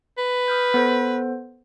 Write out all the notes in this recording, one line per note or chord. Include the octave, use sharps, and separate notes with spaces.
B4
D#6 F6 G6
B3 A4 C5